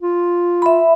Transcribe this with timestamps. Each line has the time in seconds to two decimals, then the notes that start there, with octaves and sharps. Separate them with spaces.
0.02 F4
0.62 E5 B5